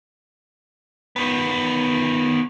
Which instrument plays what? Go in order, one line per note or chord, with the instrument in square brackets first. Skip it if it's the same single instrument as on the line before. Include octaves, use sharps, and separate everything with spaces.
[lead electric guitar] D#3 B3